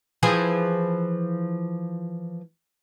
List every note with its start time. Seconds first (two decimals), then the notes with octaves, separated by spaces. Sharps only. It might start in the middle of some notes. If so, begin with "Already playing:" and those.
0.23 E3 F3 G#4